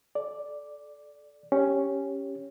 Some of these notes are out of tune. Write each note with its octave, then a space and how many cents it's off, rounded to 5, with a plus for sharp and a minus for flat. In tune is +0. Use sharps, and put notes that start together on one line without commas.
A4 -25 D5 +0
C#4 +0 G4 +5